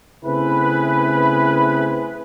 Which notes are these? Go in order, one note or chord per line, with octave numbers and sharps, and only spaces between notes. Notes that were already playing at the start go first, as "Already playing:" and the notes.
C#3 A3 C4 E4 G#4 B4